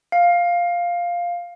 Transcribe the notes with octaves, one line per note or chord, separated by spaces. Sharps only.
F5